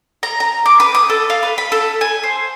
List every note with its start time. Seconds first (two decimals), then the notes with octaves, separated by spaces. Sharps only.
0.23 A#5
0.40 A#5
0.66 D6
0.80 B4
0.95 D#6
1.10 A4
1.30 F5
1.43 B4
1.58 B5
1.72 A4
2.01 G#5
2.23 C5